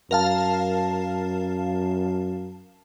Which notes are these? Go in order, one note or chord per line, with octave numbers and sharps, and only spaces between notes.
F#2 A#4 F5 A5